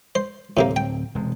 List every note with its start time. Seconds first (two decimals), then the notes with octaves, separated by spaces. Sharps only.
0.15 C5
0.57 D1 A2 C3 A#3 C4
0.76 G5
1.15 E1 C3 G#3